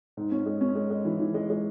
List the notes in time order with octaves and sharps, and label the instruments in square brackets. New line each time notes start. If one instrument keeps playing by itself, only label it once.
[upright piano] G#2
C#4
G#3
C#4
G#3
G#3
E3
E3
G#3
G#3